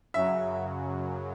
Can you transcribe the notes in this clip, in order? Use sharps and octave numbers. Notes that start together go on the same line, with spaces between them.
F#2 C#3 F#3 E5